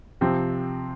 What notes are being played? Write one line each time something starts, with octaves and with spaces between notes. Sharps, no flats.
C3 F3 C4